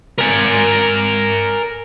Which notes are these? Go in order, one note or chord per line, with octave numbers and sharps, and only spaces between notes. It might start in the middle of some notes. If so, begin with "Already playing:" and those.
A#4 G#5